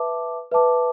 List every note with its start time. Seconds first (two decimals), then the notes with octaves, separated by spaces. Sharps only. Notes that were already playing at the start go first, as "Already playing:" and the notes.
Already playing: B4 E5 A5 D6
0.52 B4 E5 A5 D6